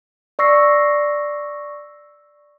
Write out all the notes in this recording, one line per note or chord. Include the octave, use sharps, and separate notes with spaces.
D5 C#6 E6 A#6 C7